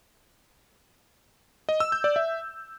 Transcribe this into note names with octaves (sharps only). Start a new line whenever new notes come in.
D#5
E6
G6
D5
E5